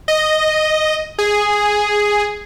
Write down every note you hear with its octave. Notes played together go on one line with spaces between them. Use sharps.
D#5
G#4